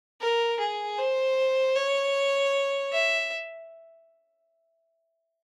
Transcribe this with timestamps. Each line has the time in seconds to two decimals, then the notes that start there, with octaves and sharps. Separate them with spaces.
0.21 A#4
0.60 G#4
0.99 C5
1.76 C#5
2.92 E5